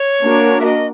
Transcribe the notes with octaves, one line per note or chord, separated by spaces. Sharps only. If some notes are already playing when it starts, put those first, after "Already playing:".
Already playing: C#5
A#3 D4 F#4 A#4
E5
D#5